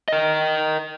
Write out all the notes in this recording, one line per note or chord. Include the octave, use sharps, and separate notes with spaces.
A#4 D#5